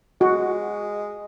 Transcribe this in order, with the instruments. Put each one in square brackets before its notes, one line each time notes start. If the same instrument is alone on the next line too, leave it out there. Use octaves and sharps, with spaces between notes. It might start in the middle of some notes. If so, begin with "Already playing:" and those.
[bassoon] G#3 [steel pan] F#4